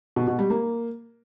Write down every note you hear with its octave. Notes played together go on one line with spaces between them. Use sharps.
B2
B2
G3
A#3